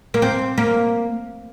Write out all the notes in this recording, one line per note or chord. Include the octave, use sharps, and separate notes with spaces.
A#3
C4
A#3